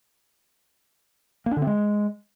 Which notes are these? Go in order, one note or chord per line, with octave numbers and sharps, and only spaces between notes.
A#3
D4
D3
C4
G#3